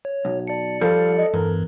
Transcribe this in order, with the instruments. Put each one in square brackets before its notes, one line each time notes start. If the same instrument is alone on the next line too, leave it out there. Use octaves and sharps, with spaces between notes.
[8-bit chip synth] C#5
[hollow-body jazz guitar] B1
[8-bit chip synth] D5 C#7 [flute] A5
[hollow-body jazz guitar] F3 G3 [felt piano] A4 [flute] F5
[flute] D#5
[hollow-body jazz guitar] E2 [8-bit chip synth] G2 [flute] A#4